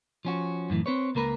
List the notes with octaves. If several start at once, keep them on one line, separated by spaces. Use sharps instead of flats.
F3 C#4 F#4
F#2 A2 D#3 E3
C4 B4 C#5
C#2 A#3 A#4 B4